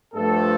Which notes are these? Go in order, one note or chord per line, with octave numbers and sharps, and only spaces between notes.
G2 F3 A3 A4